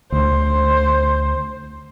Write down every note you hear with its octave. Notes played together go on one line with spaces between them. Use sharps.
D2 C5